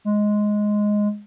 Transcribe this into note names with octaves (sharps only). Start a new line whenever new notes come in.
G#3